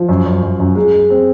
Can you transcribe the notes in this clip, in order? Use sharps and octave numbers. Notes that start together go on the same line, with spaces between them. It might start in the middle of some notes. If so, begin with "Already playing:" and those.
Already playing: F3
F#2
F#2
F#2
F#2
G#3
G#3
C4